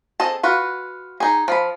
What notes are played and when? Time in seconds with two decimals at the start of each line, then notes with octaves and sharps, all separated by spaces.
0.20 C4 G#4 A4 D#5 A5
0.43 F4 F#4 B4
1.20 D#4 G#4
1.48 F3 B5